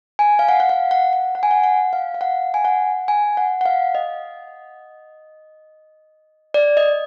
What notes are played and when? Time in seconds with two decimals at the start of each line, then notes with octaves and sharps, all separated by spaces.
0.19 G#5
0.39 F5
0.49 F#5
0.60 F#5
0.69 F5
0.91 F#5
1.13 F#5
1.35 F#5
1.43 G#5
1.51 F#5
1.64 F#5
1.93 F5
2.14 F5
2.21 F#5
2.54 G#5
2.65 F#5
3.08 G#5
3.37 F#5
3.61 F#5
3.66 F5
3.95 D#5
6.54 D5
6.77 D#5